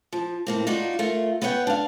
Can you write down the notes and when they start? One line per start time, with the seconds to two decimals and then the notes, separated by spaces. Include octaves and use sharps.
0.13 F3
0.47 A2 A#3 C4
0.67 D#4 F4 F#4 D5
0.99 A3 F4 A#4
1.42 B3 B4 C#5 F#5 G5
1.67 D4 F5